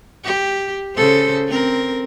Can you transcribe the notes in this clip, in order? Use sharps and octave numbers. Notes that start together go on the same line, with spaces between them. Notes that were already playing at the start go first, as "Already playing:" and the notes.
G4
C#3 A4 C5
C4 A#4